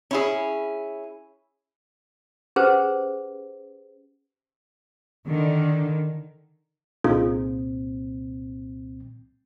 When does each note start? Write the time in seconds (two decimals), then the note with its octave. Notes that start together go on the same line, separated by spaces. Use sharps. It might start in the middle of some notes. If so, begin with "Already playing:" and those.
0.11 C#4 E4 G#4
2.56 C#4 G4 G#4 B4 C5
5.25 D3 D#3
7.04 C2 A#2 C4 D#4 F4 G#4